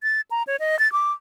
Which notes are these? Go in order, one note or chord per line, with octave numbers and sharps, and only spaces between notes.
A6
A#5
C#5
D#5
A6
D6